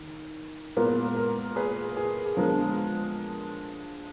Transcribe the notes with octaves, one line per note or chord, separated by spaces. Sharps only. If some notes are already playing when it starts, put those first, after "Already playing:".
Already playing: D#3
A#2 G#3 B3 A#4
A#4
G#4 B4
G#4
G#4
D3 F3 G#3 B3 A#4